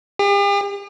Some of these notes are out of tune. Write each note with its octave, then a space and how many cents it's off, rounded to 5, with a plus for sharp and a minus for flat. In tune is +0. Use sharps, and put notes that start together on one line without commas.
G4 +45